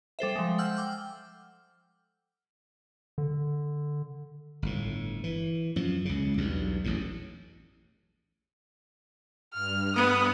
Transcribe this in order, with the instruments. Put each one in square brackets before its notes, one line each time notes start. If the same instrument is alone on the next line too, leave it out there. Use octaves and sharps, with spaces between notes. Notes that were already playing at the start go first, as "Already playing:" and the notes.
[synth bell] G3 A4 C5 E5
F3 G#3
F#5 E6 F6 G6
G5 D6 F6
[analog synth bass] D3
[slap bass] G1 A2
E3
F#2 F3
C#2 C#3
B1 E2 G2
A1 E2 A2
[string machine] G2 [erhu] F6
[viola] B3 [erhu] D#6